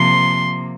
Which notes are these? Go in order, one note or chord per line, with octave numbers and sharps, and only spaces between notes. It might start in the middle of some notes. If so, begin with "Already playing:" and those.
Already playing: C3 F3 A#3 C6